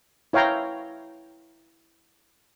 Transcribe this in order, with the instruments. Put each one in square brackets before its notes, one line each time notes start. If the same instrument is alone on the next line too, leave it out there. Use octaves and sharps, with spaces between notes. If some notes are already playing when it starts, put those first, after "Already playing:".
[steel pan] E4 C#5 F5 G5 A#5